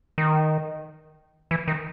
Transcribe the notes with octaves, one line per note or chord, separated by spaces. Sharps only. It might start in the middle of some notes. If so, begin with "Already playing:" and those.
D#3
E3
D#3